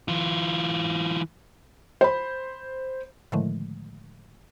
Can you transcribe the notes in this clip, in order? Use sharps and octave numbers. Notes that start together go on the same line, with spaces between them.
E3 F4
C5 B5
A2 D3 D#3 F3 G#3 A3